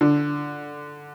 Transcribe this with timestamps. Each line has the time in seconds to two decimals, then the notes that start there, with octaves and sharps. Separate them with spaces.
0.01 D3